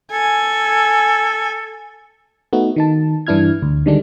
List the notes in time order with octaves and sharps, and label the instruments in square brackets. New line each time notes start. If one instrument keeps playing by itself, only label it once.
[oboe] A4 [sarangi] G#5
[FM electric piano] A3 B3 D#4 F#4
D#3 D#4 A5
G2 E3 D4 E4 F6 G#6
D2
D3 D#3 G3 G#3 D4